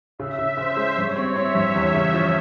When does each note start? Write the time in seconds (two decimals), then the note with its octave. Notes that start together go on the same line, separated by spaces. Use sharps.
0.19 C#3 E5
0.39 C#3
0.57 C#3 C5
0.77 G#3
0.97 G2 C#5
1.16 C4
1.36 C4 E5
1.55 G2
1.75 E2
1.94 C#3
2.13 F3